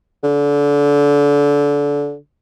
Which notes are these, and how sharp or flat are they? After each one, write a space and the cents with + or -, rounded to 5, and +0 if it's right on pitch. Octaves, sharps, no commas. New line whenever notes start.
D3 -25